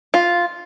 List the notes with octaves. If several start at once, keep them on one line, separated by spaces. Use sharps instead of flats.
F4